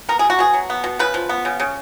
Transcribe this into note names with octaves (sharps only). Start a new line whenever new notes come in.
B3 A#4
B2 G#4
F#4
B2 G#4
F#3
B3
B2
C#3 B4
F3
B3
C#3
C#3